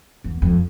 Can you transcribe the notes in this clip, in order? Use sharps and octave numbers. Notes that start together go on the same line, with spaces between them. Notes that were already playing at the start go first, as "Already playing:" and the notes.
E2
F2